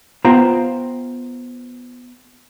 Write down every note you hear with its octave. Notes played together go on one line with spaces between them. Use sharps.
B3 F4 C5 F5 G5 A#5